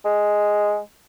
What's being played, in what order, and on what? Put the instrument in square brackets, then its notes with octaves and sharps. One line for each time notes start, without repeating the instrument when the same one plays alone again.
[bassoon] G#3